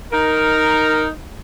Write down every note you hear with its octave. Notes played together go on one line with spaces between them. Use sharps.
D#4 A#4